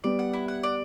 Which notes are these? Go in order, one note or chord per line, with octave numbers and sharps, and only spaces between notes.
G3 B3 D5
F#5
E4
F#5
D5